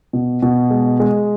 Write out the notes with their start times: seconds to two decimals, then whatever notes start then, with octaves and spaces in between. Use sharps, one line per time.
0.13 B2
0.42 B2
0.70 G#3
1.00 G#3